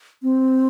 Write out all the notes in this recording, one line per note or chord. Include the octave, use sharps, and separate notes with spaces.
C4